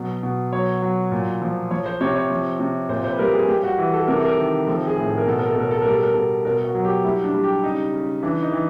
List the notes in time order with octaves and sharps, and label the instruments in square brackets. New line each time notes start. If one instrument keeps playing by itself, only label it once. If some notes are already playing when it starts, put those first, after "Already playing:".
Already playing: [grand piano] B2 F#3
B2
F#3 C#5
F#3
A#2
F3
F3 C#5
C5
C3 C#5
C#5
F3
C3
A#2 C5
C5
B4
G3 A#4
G#4
G3 G4
F#4
E3
A4
C3 A#4
A4
A#4
D#3
F3 A4
G#4
A2
A4
A#4
B2 A4
A#4
A4
B2 A#4
A4
G3 A#4
A4
A#4
B2 A4
B2 A#4
F#4
F#3
G4
G3 E4
D4
G3
G4
C#3 D#4
C#3
E3 D4
D#4
E3